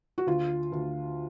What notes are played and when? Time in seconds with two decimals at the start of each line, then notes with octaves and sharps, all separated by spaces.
0.18 F#4
0.27 D2 F4
0.72 D2